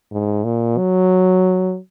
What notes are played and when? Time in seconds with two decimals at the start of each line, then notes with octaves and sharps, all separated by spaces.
0.12 G#2
0.44 A#2
0.78 F#3